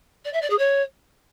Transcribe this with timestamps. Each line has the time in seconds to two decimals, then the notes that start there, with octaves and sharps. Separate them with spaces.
0.25 D5
0.33 E5
0.42 D5
0.50 G#4
0.58 C#5